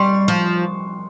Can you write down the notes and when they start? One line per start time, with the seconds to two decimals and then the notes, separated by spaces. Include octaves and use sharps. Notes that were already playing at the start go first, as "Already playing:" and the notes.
Already playing: G3 C6 C#6
0.28 F3